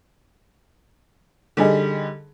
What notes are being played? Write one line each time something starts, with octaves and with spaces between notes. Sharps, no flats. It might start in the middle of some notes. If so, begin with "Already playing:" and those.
D3 G3 D#4 G#4